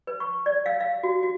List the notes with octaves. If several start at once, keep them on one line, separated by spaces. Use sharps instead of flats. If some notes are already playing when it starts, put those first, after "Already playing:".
B4
C#6
D5
F5
F5
F#4
F#4